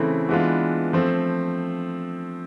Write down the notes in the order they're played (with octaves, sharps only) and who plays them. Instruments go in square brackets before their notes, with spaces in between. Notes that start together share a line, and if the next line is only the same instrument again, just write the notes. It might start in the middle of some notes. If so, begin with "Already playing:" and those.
Already playing: [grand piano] C#3 E3 A3 C4 E4
E3 G#3 B3 D4 F4
F3 A3 C4